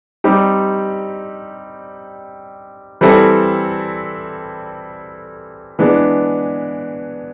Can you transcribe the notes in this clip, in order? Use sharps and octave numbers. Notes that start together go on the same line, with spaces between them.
G3 C4 D#4 G4
E3 G3 C4 E4 A4
E3 G#3 B3 D4